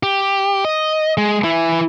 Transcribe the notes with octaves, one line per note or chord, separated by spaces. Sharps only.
G4
D#5
G#3
E3 E4